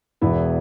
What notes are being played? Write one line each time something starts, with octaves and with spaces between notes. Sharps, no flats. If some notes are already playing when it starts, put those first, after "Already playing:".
E1 E2 E3 B3 E4